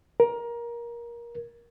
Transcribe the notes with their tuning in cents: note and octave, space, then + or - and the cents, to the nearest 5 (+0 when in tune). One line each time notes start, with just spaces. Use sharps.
A#4 +20